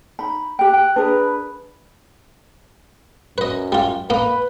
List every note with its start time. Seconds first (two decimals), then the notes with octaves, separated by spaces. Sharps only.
0.19 D#4 B5
0.59 G4 G5 F#6
0.73 G5
0.96 D4 G#4 A#4 B4
3.38 F#2 B4 D#5
3.72 G3 F4
4.10 A#3 D#4 B4